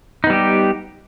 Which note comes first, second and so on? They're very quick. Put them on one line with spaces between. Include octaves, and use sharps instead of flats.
D#4 B3 G3 G4